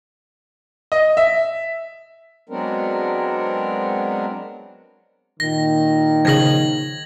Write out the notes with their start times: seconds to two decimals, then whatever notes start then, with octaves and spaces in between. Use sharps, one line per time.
0.92 D#5
1.17 E5
2.49 F#3 G#3 B3 C4 D4 A#4
5.40 A#2 D#3 A#6
6.25 C#3 F3 G#6 A#6 F#7